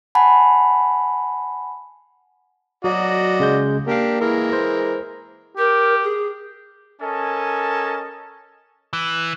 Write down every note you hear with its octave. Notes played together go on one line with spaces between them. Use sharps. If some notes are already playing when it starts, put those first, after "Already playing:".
F#5 G#5 A5 B5
F#3 F#4 D5 D#5
C#3 G#3 G6
A#3 D4 G4 A#4 F5
E3 G#3 A#4
C5
G4 A#4
G#4
C#4 A4 A#4 D#5 G#5 A5
E3